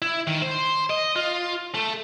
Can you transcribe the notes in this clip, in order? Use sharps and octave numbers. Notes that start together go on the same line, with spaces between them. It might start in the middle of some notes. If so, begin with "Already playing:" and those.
E4
D#3
C5
D#5
F4
A3